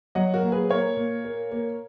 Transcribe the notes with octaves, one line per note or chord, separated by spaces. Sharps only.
F#3 D#5 F#5
F#4 A#4
A#2
G#4 B4
A#3 A#4 C#5
A#2
A#3
A#3